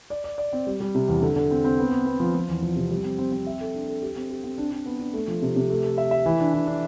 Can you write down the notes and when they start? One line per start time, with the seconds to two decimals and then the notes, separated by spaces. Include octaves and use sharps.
0.10 D5
0.24 D5
0.38 D5
0.53 C4
0.67 G3
0.80 G3
0.95 C3
1.08 E2
1.22 D3
1.36 D3
1.51 C4
1.64 C4
1.79 B3
1.92 B3
2.06 B3
2.20 F3
2.35 F3
2.49 E2
2.62 F3
2.76 C3
2.90 G3
3.04 C4
3.19 C4
3.32 C4
3.46 E5
3.61 A4
3.74 D4
3.88 A4
4.02 G4
4.16 C4
4.30 G4
4.44 C4
4.58 D4
4.71 D4
4.86 B3
4.99 D4
5.13 A3
5.28 F3
5.42 C3
5.56 C3
5.70 A3
5.84 A4
5.98 E5
6.11 E5
6.26 E3
6.40 D4
6.54 E3
6.67 D4